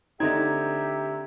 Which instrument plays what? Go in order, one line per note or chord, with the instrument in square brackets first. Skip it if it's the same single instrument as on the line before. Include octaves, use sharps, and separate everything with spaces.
[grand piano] D3 A3 C4 [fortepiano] D#4 [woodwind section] G4 E5 [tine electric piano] A#5 G#6